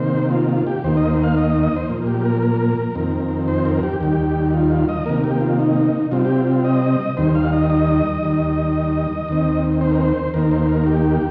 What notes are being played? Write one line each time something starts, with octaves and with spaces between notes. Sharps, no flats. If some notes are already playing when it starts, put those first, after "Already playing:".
Already playing: C3 D#3 A#3 C5
F4
F4
G4
D#2 D#3 A#3 C5
D#5
C5
F5
D#5
D#5
D#5
C5
A#2 F3 A#3
G4
A#4
A#4
F2 D#3 C4
C5
A#4
G4
D#2 D#3 G3 G4
F4
F4
D#5
C3 D#3 A#3 A#4
G4
F4
D#4
C3 G3 C4 F4
G4
F4
F4
D#5
D#2 D#3 G3 C5
F5
D#5
D#5
D#2 D#3 G3
D#2 D#3 C4
C5
A#4
C5
D#2 D#3 A#3 A#4
C5
A#4
G4